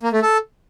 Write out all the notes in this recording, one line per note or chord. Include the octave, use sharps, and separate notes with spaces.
A#3
A3
A4